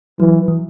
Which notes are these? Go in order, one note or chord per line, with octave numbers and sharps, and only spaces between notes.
E3 F#3
E3